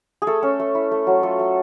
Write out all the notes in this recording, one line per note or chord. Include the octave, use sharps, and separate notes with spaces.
G#4
A3 A4
C#4
A3
E4
A3
F#3
F4 A4
A3